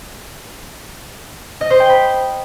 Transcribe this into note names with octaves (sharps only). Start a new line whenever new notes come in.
D#5
C5
G5
B5